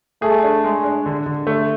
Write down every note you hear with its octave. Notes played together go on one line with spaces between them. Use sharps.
A3 G#4
D4
G#3
D4
D3
D3
A3